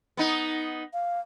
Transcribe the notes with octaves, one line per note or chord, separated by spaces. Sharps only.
B3 D#4
F5